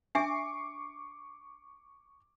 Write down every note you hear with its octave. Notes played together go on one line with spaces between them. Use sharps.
D4 E5 G#5 C#6 D6 C7